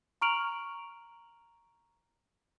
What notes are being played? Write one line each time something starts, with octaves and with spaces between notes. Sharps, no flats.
A#5 C#6 F6 D7 F7 F#7